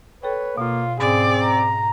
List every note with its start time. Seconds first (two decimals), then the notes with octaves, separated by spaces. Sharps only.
0.23 A4 B4 C#5 G5
0.58 B2 A#3 F4
1.00 G#2 C4 C#4 G#4 D5
1.43 A#5